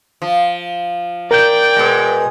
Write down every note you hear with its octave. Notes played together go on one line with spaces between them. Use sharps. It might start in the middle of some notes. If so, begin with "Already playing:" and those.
F3
A#4 D5 G5 G6
B2 G#3